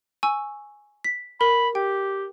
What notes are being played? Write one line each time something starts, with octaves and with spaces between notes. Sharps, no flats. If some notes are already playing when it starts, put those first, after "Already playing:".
G#5 C#6 E6
B6
A#4 B5
G4 G5